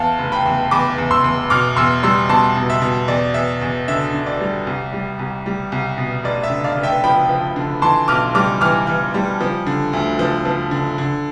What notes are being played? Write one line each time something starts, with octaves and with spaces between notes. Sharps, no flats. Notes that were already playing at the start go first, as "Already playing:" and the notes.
Already playing: E2 F5 A5
F1
G5 B5
E2
E2 B5 D6
E2
C6 E6
E2
B2 D6 F6
E2 C6 E6
G3 C6 E6
B2 A5 C6
B2
E5
B2
E2 D5
E2 E5
E2
D3 E5
D3
D5
G3
C2
G3
C2
G3
C2
B2
F1 D5
E5
D3
D5 F5
F1
E5 G5
F3 G5 B5
F3
D3
E3 A5 C6
B1 D6 F6
G3 D6 F6
E3 D6 F6
E3
G3
F3
D3
D2
F3
F3
D3
D3